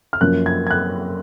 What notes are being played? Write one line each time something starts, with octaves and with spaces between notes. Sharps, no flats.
F6
F#2 F3 A#3 F#6
G#6
G#6
F#6